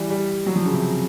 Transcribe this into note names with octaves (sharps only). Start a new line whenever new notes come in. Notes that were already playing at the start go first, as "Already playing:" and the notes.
Already playing: E3 G3
G3
F#3
F3
C#3
C3